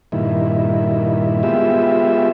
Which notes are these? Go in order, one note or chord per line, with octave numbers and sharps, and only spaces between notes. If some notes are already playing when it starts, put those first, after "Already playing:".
G2 A#2 D#3 E4
G#3 B3 F4 G4 E5